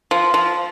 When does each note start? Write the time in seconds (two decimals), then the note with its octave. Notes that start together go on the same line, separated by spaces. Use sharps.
0.11 F3
0.34 F3